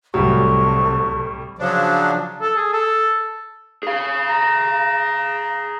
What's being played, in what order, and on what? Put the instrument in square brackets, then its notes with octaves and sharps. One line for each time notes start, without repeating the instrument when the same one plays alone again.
[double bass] C2 [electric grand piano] A2 G3 [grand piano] F#3 [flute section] A4 C#6
[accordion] C#3 F3 F#3 D4
[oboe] A4
G#4
A4
[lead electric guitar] G#4 F5
[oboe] A#5